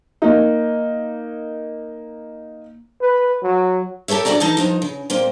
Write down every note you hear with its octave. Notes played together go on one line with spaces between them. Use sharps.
A#3 D#4
B4
F#3
G4 A4 A#4 C#5 E5
D2 F#3 F#4 D5 A#5
E3 D#4 A5 A#5
A2 F3 D#4
C#3
A#2 A#3 C4